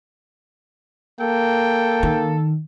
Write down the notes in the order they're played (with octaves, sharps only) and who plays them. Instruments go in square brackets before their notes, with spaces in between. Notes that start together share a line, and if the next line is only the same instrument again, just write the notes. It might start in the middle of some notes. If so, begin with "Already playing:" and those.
[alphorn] A#3 [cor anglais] A4 [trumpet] G5
[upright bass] D#3